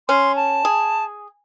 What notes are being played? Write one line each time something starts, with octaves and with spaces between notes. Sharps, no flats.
C#4 C6
A5
G#4